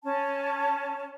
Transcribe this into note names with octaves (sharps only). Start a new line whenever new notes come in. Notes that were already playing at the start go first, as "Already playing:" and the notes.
C#4 A5